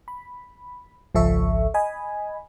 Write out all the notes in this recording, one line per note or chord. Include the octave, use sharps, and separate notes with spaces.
B5
G#1 C#2 F3 A4 E5 C#6
D#5 G#5 B5